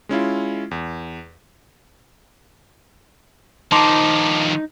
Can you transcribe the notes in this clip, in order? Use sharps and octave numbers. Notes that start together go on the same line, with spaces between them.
G#3 C#4 E4 F4
E2
D#3 F3 D#4 A5 C6 D6